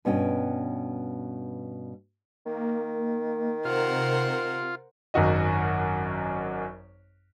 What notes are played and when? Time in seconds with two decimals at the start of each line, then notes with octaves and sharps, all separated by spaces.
0.05 G2 B2 C#4 G5
2.46 D#3 A#3
3.65 C3 F4 A#4 C5 F#5
5.14 G#1 F#2 F#3 F#4 D#5